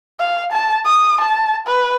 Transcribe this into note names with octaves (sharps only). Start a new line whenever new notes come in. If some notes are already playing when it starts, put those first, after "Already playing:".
F5
A5
D#6
A5
B4